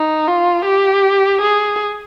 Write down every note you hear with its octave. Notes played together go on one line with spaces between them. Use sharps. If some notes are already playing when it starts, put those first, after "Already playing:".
Already playing: D#4
F4
G4
G#4